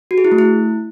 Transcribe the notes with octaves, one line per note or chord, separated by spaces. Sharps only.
F#4
G#4
E4
A3
E4